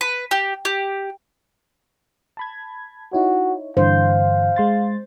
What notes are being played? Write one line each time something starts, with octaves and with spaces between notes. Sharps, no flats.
B4
G4
G4
A5 B5 G#6
D#4 E4 F#4 C#5
G2 D3 E3 C5 F5
G#3 C6 A6